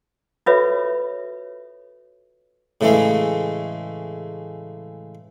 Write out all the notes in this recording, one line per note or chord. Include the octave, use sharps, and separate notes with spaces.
F4 F#4 A4 B4 C#5 E5
A2 C#3 E3 G#3 A3